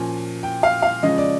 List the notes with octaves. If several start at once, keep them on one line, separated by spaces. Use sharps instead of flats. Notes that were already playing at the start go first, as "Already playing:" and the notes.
Already playing: A#2 F3 A#3 C#4 G#5
G5
F5
F5
C#3 F3 G#3 C#4 D#5
D5